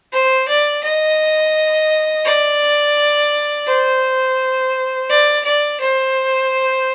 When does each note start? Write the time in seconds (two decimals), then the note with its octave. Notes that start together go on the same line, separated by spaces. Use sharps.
0.12 C5
0.48 D5
0.83 D#5
2.25 D5
3.67 C5
5.09 D5
5.45 D5
5.80 C5